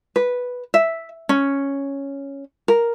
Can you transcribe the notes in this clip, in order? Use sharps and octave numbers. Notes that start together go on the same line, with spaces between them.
B4
E5
C#4
A#4